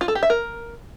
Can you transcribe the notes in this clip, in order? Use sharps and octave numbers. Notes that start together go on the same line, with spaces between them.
F4
A4
G4
E5
A#4